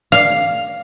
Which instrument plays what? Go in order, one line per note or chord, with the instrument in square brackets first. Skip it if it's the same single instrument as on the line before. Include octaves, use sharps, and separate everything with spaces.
[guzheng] F5